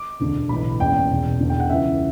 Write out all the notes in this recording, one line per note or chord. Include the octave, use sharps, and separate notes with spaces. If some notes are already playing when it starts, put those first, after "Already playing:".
Already playing: D6
E1 D2 D3
B1 A2 E3 B5
F#1 E2 C#3 E3 G5
E1 E2 B2
E1 E2 D3
G5
F#5
C#2 C#3 E3 E5